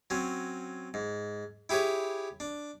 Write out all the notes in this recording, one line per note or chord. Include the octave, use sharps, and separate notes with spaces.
F#3 C4 C#4
G#2
E4 G4 G#4 B4 C#5
D4